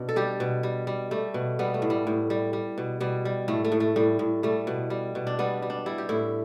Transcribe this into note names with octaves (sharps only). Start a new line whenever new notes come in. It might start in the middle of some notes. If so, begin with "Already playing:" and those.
Already playing: B2 D4
A4
G3 G4
B2
G3
G3
G3 A3
B2
G3 B3
A3
A2
G3
A2
G3
G3
B2
B2 G3
G3
A2 A3
A3
A2
A3
A2 G3
A2
G3 A3
B2
G3
B2
D4
G3 B3
G3
D4
G3 E4
G4
A2 E4